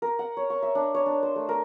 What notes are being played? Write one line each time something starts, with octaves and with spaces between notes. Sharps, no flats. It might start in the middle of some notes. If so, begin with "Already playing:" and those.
A#4
F#5
C#5
C#6
E5
D4
C#5
D4
C5
A3
A#4